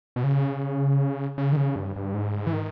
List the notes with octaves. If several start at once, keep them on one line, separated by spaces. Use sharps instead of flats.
B2
C#3
C#3
D#3
C#3
G2
G2
G#2
E3
D#3